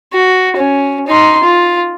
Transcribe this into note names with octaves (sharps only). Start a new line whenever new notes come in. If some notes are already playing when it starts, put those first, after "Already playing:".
F#4
C#4
D#4 C6
F4